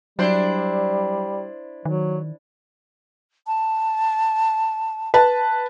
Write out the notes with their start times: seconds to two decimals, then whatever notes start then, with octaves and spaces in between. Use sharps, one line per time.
0.19 F#3 G3 D4 E4 C5
1.85 D#3 F#3
3.47 A5
5.14 B4 A5